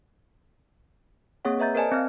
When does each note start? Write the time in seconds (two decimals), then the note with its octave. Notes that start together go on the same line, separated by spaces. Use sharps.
1.45 A#3 C4 G#4 C#5 F#5
1.59 B4 D#5 E5 A#5 G6 A6
1.75 A#4 C5 D5 D#5 G#5 A5
1.92 C4 D#5 F5 F6